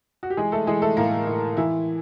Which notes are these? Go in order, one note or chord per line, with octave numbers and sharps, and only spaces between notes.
F#4
G4
E3 G#3 G#4
A3 A4
E3 G#3 G#4
A3 A4
A2 A#3 A#4
A2
E3 E4